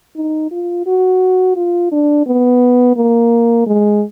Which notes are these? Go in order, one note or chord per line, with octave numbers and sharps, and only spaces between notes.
D#4
F4
F#4
F4
D4
B3
A#3
G#3